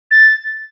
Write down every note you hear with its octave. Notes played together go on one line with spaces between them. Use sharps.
A6